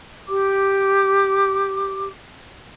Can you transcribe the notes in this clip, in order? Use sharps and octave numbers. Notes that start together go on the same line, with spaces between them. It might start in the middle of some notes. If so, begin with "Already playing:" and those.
G4 D6